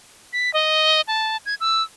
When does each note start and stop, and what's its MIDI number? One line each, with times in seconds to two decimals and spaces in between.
0.33 0.53 95
0.54 1.01 75
1.08 1.37 81
1.46 1.55 92
1.60 1.83 88